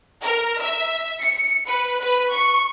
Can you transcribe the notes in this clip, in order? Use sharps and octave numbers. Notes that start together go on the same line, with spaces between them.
A#4
E5
C#7
B4
B4
C#6